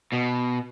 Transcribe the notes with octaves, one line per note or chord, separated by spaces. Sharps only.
B2